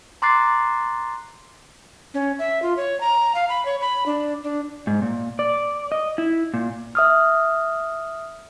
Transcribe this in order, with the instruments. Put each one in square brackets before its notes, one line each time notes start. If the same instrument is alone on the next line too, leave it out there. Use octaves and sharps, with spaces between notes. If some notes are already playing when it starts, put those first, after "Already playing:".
[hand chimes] A#5 C6 D6 F#6 A6 C7
[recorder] C#4
E5
F4
C#5
A#5
F5
B5
C#5
B5
D4
D4
[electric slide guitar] G#2
A#2
D5
D#5
E4
A#2
[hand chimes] E5 D#6 F6